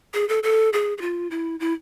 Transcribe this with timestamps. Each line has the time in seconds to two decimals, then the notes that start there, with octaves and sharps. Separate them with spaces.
0.14 G#4
0.29 A4
0.43 A4
0.73 G#4
0.98 G#4
1.01 F4
1.31 E4
1.60 E4